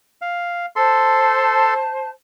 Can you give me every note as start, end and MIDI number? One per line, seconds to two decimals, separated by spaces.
0.22 0.66 77
0.76 1.74 69
0.76 2.08 72
0.76 2.08 81
0.76 1.74 84